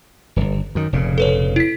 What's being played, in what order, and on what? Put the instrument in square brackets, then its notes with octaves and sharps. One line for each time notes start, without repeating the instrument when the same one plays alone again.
[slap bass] D1 G1
F#2 D#3
F1 A#2 C#3
[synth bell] A4 B4 C#5
E4 B6